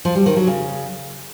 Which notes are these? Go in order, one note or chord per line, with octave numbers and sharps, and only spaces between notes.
F3
G3
D#3
F#3
C#3